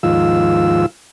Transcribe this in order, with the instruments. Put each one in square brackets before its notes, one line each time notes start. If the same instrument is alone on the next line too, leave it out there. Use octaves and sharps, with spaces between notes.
[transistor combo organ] D#2 G#2 F3 F4 E6